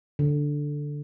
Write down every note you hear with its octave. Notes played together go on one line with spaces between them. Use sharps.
D3